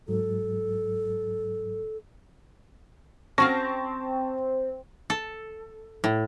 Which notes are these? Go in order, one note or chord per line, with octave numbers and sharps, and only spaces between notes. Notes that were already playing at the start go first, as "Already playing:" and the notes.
G#2 F#3 A4
C4 C#4 F#4 F5 A5 C#6 A#6
A4
A2